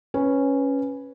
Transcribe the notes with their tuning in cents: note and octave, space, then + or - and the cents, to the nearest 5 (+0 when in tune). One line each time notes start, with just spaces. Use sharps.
C#4 -5 B4 +0